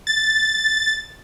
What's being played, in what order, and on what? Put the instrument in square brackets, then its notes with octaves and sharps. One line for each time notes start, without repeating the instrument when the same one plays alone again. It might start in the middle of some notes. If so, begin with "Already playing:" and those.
[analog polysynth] A6